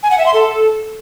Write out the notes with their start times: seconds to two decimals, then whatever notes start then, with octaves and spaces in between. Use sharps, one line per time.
0.03 G#5
0.11 F#5
0.18 E5
0.26 C6
0.34 A4